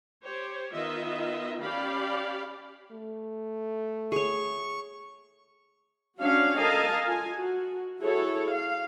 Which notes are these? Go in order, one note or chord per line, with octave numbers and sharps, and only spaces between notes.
G4 C5 C#5
D#3 B3 F4 D#5 E5
C#4 G4 D5 F5 B5
A3
G#4 C#5 C#6
C#4 D4 F#4 C#5 F5
A4 A#4 D#5 F5 G#5 A5
F4 G#5
F#4
E4 F#4 G#4 A4 C#5
F5